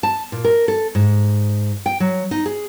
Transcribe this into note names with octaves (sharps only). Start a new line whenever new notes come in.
A5
A#2
A#4
A4
G#2
G5
F#3
D#4
G#4